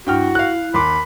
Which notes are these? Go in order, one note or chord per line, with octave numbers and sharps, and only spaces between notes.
G2 E4 F#4 G5 F6
F5 F#6
D#2 B5 C6 D6